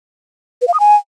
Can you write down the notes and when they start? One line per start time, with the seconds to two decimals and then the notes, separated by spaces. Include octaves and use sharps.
0.62 B4
0.68 F5
0.74 D#6
0.80 G#5